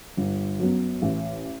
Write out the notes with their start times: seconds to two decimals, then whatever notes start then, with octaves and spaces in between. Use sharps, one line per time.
0.17 G1
0.59 F#2 F#3 B3
1.02 A1